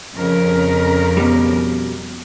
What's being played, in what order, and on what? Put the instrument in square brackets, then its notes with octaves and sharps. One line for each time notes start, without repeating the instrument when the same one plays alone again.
[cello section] F2 C#3 A#4
[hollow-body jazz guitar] B2 G3